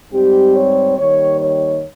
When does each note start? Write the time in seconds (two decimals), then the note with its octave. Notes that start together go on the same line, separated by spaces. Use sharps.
0.12 G#2 G3 C4 G4
0.54 C#5
0.98 D#2 D#3 G3 C#5
1.39 C#5